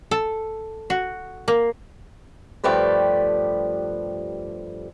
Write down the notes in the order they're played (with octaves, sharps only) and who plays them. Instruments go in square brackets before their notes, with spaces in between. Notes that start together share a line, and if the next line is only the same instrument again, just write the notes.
[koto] A4
F#4
A#3
[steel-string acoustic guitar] G2 F3 A3 G4 B4 D5